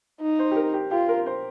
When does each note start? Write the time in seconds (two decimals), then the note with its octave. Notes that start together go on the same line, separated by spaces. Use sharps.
0.21 D#4
0.39 C5
0.51 G4
0.56 A#4
0.74 G4
0.91 F4 G4
1.08 A#4
1.26 C5